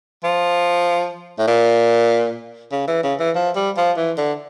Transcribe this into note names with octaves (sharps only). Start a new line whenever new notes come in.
F3
A2
A#2
C#3
E3
C#3
E3
F3
G3
F3
E3
D3